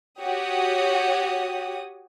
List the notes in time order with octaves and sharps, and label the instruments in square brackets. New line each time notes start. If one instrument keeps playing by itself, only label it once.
[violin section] F#4 G4 C#5 D#6